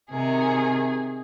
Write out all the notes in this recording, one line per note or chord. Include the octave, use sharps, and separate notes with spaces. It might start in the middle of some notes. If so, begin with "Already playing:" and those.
C3 D#3 G#4